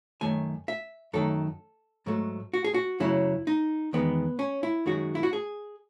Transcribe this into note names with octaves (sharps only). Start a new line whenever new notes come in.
F#2 D#3 A3 G#5
E5
F#2 D#3 A3 A4
G#2 F#3 A3
F#4
G#4
F#4
F#2 C#3 F#3 A3 E4
D#4
E2 D#3 G#3 B3
C#4
E4
F#2 D#3 G#3 F#4
E4
F#4
G#4